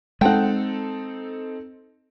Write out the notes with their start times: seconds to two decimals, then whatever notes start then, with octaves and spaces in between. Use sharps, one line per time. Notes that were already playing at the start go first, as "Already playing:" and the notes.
0.21 G#3 C4 D#4 A4 F#5 G5